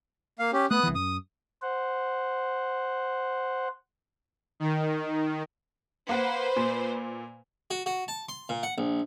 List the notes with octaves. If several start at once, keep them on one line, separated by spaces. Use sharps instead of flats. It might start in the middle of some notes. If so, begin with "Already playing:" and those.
A#3 F5
C#4 G4
A3 B3 D#6 F#6
C2 E3
F#2 D#6
C5 F#5
D#3
A#3 B4 C5 F#5
A#2
F#4
F#4
A5
C6
A#2
F#5
A#1